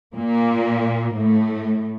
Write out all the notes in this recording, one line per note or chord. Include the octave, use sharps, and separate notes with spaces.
A#2 A#3
A2 A3